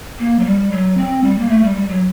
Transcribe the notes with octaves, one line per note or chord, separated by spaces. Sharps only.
A#3
F#3
G3
F#3
C4
G3
A#3
A3
G3
G3
F#3